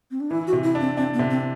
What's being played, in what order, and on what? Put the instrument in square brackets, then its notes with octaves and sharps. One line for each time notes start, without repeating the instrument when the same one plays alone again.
[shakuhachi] C4
D4
[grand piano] E3 [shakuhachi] E4
[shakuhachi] F#4
[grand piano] C3
[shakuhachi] E4
[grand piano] D4
[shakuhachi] C4
[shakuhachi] C4 [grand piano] D4
[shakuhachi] B3
[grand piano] C3
[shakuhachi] C4